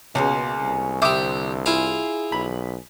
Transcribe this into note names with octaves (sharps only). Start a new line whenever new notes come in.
C#2 B2 G#3 A#3 C#4
C2
D3 G4 C5 E5 D6 D#6
E4 F4 G#4 F5
B1 B5